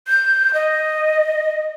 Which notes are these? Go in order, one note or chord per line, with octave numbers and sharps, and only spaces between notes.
G6
D#5